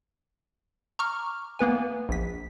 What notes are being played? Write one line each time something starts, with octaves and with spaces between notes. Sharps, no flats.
A#5 C#6 D6 F6
A#3 B3 B4 G#5
A#1 B6